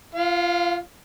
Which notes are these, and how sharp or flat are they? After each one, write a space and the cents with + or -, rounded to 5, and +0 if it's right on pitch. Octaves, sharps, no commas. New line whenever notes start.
F4 -25 F5 +20